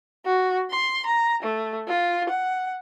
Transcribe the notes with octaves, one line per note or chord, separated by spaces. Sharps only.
F#4
C6
A#5
A3
F4
F#5